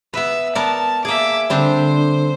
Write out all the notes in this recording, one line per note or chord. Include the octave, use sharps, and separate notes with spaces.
B3 B4 E5
B3 A#4 D5 A5
A#3 G#4 E5 D6
D3 G3 C4 D4 C5